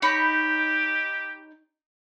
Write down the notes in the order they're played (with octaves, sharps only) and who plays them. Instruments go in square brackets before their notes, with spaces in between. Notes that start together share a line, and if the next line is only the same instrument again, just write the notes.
[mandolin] D#4 C#5 B5 [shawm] G4